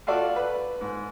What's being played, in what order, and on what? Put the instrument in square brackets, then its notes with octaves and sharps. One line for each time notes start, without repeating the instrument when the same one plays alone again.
[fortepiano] F4 F#4 A4 D5
B4
G#2